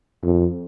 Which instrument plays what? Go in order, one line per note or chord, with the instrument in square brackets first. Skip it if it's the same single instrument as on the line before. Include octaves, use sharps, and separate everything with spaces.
[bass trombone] F2